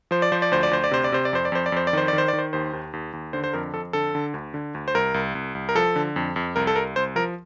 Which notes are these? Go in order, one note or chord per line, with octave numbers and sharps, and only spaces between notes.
F3 C5
D5
F3 C5
D5
D2 C5
D5
D2 C5
D5
C3 C5
D5
C3 C5
D5
F2 C5
D5
F2 C5
D5
F2 C5
D5
D#3 C5
D#3 D5
C5
D#3 D5
C5
D#2 C5
D#2
D#2
D#2
D3 C5
C5
F2 A#4
F2 A4
D3 A4
D3
D2
D3
D2
C5
C2 A#4
C2
C2
C2
A#4
F3 A4
D3
F2
F2
C2 A#4
A4
C2 A#4
C2 C5
F3 A#4